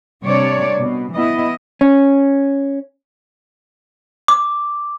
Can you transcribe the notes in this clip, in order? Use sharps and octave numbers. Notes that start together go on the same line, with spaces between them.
C3 G3 D4 C#5 D5
B2
E3 B3 E4 D#5
C#4
D6